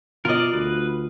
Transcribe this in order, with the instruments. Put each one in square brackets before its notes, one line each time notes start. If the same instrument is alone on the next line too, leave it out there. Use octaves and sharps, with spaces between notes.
[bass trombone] B2 [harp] F4 D#5 [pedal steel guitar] A#4 D5
[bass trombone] D2 [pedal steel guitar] B4